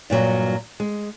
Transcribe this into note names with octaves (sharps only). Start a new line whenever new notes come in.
G2 A#2 F#3
G#3